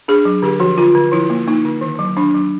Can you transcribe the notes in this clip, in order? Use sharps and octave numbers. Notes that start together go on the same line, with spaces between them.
D4 G#4
F#3
D3 G4
F3 F#4
D3 F4
D3
F3 E4
A#3
A#3 D#4
D3
D#3
F#3
D#3 D4
F#3